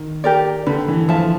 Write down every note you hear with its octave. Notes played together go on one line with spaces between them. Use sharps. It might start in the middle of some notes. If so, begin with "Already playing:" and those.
Already playing: D#3
G4 A#4 D5
D3 B4
E3
F3 E5 A5